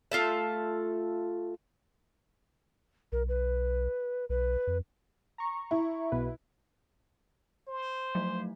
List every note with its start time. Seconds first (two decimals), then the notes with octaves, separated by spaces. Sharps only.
0.12 A3 F4 A4 E5
3.12 B1 A#4
3.29 B4
4.29 B1 B4
4.67 F2
5.38 A#5 C#6
5.71 E4
6.12 B1 B2 B4
7.67 C5
8.15 F3 F#3 A3